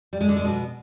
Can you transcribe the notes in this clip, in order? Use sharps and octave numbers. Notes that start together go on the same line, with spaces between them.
G3
G#3
D3
G#3
B2